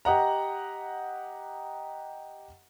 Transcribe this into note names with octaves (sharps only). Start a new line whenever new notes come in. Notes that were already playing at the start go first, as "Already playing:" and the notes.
G4 D#5 F#5 A#5